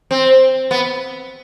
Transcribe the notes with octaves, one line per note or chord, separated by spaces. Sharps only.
C4
B3